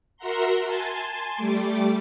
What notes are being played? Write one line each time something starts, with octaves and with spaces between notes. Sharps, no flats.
F#4 A#4 E5 F#5 A#5 C6
G#5 A5 C6 A6
G3 A3 D6